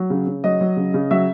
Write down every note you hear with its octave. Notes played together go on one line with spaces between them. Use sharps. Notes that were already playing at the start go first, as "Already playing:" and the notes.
Already playing: F#3
C#3
C#3
F#3 D#5
F#3
C#3
C#3
F#3 E5